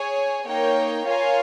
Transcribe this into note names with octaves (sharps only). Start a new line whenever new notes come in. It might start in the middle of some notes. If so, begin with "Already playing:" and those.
Already playing: G#4 C#5 G#5
A#3 D#4 A#4 C#5 G5
F4 A#4 C#5 F5 G#5